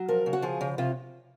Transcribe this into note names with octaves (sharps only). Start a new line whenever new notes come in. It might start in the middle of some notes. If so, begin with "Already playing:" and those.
Already playing: F#3
F3 A#4
C#3
F#4
F3 G#4
C#3
C3 F4